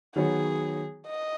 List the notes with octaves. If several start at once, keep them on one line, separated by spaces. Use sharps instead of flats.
D#3 F#3 B3 F#4 G#4 C#5
D#5